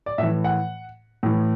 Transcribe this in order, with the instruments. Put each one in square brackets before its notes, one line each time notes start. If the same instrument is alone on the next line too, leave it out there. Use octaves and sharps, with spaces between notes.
[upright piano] D5
A2 E5
E3
F#5
A2 E3